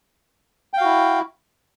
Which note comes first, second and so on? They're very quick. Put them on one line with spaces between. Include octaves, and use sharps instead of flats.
G5 F5 F#4 E4